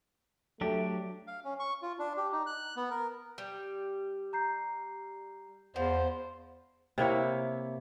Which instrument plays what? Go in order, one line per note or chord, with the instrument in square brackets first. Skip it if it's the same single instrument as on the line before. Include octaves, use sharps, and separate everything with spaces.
[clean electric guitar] F#3 D4 G4 [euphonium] A3
[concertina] F5
C#4
C#6
F4
D4
G4
D#4
F#6
B3
A#4
[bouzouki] G3
[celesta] A#5 G6 C7
[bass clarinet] E2 [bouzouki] F3 [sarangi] C5 [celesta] F#5
[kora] C3 A#3 E4 C#5